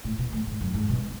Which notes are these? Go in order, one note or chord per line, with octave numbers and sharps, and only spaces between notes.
A2
B2
A2
G#2
F#2
G#2
B2